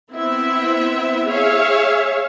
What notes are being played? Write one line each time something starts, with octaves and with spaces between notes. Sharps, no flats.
B3 C4 E4 E5
G#4 C#5 E5 F5